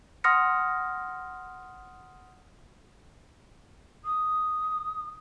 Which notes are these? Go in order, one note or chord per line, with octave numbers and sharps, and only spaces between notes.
F#5 C6 D#6 F6 A#6 C#7
D#6